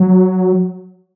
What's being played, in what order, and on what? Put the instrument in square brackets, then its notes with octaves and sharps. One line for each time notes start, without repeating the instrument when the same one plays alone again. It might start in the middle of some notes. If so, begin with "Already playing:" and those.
Already playing: [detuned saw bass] F#3